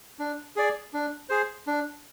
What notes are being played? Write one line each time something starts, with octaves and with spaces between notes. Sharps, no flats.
D4
G#4 D5
D4
G#4 C5
D4